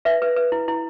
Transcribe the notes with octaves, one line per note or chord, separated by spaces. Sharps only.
B4 E5
B4
B4
E4
E4